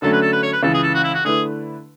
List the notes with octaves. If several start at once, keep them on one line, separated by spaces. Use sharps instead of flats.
D3 F#3 A3 C#4 A4
B4
A4
B4
C#5
B4
C#2 C#3 E3 A4
G#4
A4
F#4
E4
F#4
D3 A3 E4 G#4 B4